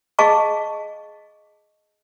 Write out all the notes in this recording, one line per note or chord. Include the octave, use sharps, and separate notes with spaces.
G#4 D#5 F5 A5 C#6